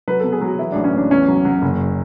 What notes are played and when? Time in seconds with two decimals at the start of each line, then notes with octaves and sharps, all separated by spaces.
0.08 F#3 B4
0.20 B2 A4
0.32 G#4
0.41 F#3 F#4
0.58 E3 E4
0.72 A1 D4
0.84 C#4
0.94 A1 D4
1.10 E2 C#4
1.28 F#3
1.45 F#3
1.62 F#1